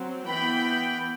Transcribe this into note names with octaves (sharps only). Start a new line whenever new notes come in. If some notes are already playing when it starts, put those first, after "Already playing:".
Already playing: F#3 C4
E3 B3 G5 B5